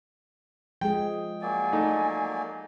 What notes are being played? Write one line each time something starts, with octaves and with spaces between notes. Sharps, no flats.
F3 G#3 G#4 G5
F#3 A#3 D5 G#5
A3 D#4